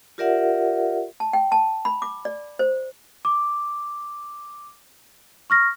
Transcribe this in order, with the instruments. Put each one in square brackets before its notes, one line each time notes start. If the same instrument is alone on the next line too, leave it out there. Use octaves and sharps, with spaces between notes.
[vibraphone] F4 G4 A#4 D5 E5 F#5
[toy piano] A5
G5
A5
B5
D6
D5
C5
[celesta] D6
C#6 F6 A#6